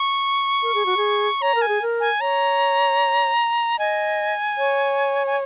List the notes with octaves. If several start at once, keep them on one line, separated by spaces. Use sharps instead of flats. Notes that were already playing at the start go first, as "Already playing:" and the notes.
Already playing: C#6
A#4
G#4
F#4
G#4
C#5 A#5
A#4
G#5
G#4
A#4
G#5
C#5 A#5
D#5 G#5
C#5
G#5